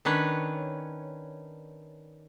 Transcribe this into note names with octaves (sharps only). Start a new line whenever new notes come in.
D#3 C#4 D4 B4 C#5